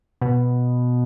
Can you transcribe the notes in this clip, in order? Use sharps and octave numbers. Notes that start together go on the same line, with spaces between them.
B2